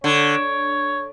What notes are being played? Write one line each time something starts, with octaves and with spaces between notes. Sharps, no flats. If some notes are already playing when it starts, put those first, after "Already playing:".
D3 C#5